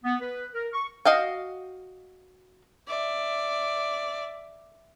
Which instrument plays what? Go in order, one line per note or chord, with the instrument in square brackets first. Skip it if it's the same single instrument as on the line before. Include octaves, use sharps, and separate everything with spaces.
[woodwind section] B3
B4
A#4
C#6
[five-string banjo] F#4 D#5 F5 G5
[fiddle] D5 E5